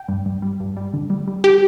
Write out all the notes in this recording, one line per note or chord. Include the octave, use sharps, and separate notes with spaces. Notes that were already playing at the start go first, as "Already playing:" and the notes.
Already playing: G5
G2
G2
G3
G2
G3
D3
G3
G3
G4